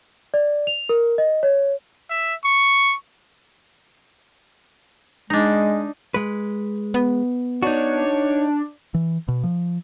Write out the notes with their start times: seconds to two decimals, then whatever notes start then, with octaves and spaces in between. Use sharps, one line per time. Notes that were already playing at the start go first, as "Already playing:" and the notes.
0.34 D5
0.67 F7
0.89 A#4
1.18 D#5
1.43 C#5
2.10 E5
2.45 C#6
5.30 G#3 D4 D#4
6.14 G#3 B4
6.94 B3
7.63 D4 D#4 F#4 C#5
8.94 E3
9.28 B2
9.44 F3